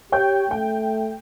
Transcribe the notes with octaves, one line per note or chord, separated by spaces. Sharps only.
G4 C#5 G5 G6
A3 G5